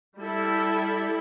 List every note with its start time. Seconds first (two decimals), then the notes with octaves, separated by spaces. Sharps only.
0.18 G3 E4 A4